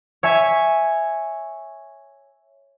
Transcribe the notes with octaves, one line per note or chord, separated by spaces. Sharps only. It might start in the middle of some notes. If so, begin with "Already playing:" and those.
C#5 E5 G#5 B6